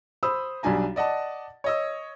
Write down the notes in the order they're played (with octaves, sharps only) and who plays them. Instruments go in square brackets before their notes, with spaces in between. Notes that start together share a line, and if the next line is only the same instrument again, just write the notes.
[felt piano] C5 B5 D#6 E6
B1 G3 D4 G#5 A#5
D5 D#5 F#5 A5
C#5 D#5 E6